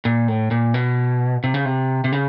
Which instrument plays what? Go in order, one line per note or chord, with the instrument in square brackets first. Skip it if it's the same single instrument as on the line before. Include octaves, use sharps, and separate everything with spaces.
[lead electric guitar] A#2
A2
A#2
B2
C3
C#3
C3
C3
C#3